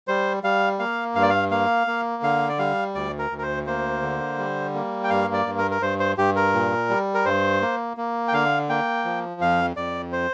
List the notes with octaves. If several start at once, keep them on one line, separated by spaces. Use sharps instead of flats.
G3 C5
G3 F5
A#3 F5
G2 F5
D5
F5
A#3 F5
A#3
D3 F5
D5
G3 F5
D2 D5
A#4
D2
A#4
C5
A#3 C5
D3
G3
A#3
G5
G2 F5
D5
G2
A#4
A#4
G2 C5
C5
G2 G4
A#4
A#2
G3
A#4
G2 C5
A#3
A#3
G5
D3 F5
A#3 G5
F3
F2 F5
F2 D5
C5